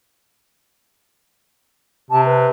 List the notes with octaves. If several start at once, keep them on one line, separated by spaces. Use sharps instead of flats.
C3 A5
B4